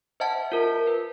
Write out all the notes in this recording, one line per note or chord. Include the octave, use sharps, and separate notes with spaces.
C5 D#5 E5 F#5 A5
F4 A#4
B4